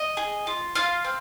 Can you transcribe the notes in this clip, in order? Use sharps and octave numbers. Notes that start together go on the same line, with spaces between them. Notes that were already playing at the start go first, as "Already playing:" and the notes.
Already playing: D#5
G#4
F4
F4 F5
C4